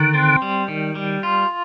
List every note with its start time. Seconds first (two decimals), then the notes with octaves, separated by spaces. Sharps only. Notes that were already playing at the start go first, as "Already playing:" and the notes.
Already playing: D3 D#3
0.14 C4
0.42 G3
0.68 D#3
0.95 G3
1.23 F4